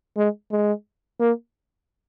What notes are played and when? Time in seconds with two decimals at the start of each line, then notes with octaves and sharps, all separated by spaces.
0.17 G#3
0.52 G#3
1.21 A#3